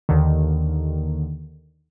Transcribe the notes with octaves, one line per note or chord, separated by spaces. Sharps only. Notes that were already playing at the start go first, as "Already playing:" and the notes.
D#2 D3 D#3